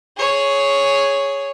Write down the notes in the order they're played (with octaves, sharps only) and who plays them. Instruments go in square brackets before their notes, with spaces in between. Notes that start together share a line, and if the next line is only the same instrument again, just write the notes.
[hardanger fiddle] G#4 C#5